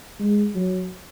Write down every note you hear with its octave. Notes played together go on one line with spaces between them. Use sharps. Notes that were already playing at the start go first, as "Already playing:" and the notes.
G#3
F#3